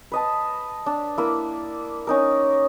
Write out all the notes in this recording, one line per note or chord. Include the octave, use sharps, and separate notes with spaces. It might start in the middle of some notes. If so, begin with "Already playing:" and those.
B4 D#5 A5
D4
A#3 E4
C#4 D#4 A#4